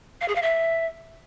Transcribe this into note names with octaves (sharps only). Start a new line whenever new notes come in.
F5
G#4
F5
E5